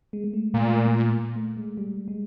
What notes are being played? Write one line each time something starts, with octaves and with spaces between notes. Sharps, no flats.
G#3
G#3
A3
A#2 A3
A#3
A3
G#3
G3
G#3